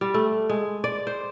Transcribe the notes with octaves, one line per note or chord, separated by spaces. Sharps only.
G3
A3
G#3
D5
C5